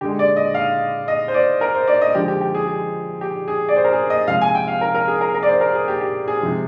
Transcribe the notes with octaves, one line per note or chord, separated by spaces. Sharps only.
D3 G#3 G4
D5
D#5
F5
D#5
C5
D5
A#4
C5
D5
D#5
D3 F3 G#3 G4
G4
G4
G#4
G#4
G4
G#4
D5
C5
A#4
G#4
D#5
C3 F3 G#3 F5
G#5
G5
F5
A#4
A#4
G#4
A#4
A#4
D5
C5
A#4
G#4
G4
G4
G#4
C3 F3 G#3